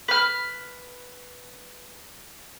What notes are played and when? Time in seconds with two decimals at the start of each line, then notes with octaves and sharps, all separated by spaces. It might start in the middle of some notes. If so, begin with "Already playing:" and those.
0.08 B4 F6